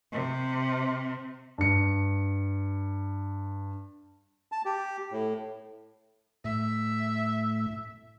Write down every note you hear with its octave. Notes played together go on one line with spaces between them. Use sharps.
C3
G2 C#7
A5
G4
A2
A2 E5